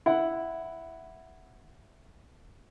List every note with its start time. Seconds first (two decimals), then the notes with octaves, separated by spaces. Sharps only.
0.06 E4 F#5